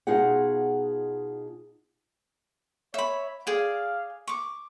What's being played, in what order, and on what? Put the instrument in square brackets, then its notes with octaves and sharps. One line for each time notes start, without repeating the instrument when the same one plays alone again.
[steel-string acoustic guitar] B2 D#4 F4 G#4 F#5
[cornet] C#5 [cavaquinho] E5 B5
[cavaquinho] G#4 D5 [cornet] F5
[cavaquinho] C#6 D6